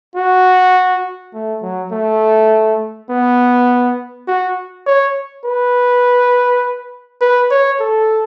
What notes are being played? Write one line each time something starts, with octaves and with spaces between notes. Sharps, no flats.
F#4
A3
F#3
A3
B3
F#4
C#5
B4
B4
C#5
A4